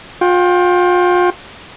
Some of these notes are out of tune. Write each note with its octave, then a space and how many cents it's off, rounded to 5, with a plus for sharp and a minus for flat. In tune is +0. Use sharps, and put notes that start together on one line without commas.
F4 +35 G5 +0